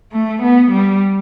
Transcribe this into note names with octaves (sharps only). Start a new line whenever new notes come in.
A3
B3
G3